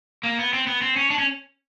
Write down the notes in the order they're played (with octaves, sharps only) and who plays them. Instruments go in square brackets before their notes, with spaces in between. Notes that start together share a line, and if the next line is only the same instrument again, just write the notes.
[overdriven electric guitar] A#3
B3
C4
B3
C4
C#4
D4
C#4